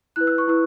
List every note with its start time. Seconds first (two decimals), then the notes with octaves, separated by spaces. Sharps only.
0.16 E4 B4 F#6
0.27 E6
0.38 C#6
0.48 E4 B4 E6